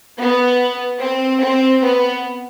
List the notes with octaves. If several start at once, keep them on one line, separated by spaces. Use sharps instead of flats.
B3
C4
C4
B3